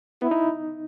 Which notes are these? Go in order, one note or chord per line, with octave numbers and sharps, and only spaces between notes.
B3 E4
D#4